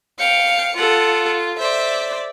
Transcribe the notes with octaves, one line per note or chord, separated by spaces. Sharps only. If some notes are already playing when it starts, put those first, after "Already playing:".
F5 G5 C#7
F4 A4 F#5
C5 D5 E5